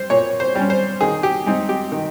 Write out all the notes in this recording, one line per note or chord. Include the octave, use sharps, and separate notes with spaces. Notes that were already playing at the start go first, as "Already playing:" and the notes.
Already playing: G3 C5
A#2 C#5
C5
G3 C#4
C5
D#3 G#4
G4
G#3 C4 D#4
G4
D#3